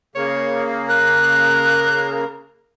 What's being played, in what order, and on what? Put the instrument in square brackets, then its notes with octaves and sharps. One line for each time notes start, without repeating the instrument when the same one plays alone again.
[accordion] C#3 A#3 [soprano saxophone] C#5
[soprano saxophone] A#4 [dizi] F#6